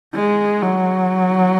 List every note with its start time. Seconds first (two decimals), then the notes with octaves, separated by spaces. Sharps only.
0.15 G#3
0.62 F#3